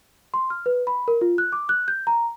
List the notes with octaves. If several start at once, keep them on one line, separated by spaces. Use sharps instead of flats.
C6
F6
B4
B5
A#4
F4
F#6
D6
F#6
G6
A#5